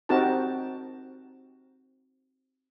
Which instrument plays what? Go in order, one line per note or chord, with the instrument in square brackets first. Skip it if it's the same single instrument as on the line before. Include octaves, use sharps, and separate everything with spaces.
[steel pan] C4 D#4 F#4 G4 A#4 A5